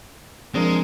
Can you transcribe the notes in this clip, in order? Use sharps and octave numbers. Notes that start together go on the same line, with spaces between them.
F3 G#3 C4 D4 A#4 D5 A#6